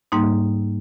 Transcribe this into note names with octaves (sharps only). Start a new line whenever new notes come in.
G#2 G3 A#3 D#4